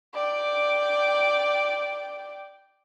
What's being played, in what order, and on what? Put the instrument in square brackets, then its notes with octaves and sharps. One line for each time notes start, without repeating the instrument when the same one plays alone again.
[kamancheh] D5 G5